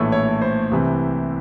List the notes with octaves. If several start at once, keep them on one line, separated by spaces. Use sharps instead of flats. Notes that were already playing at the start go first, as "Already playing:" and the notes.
Already playing: A#1 A2 E3 A3 C#5
C#5
C5
C2 C3 E3